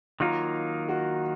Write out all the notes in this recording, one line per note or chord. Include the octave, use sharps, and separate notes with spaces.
D#3 F#3 A#3 D#4 F4
F#4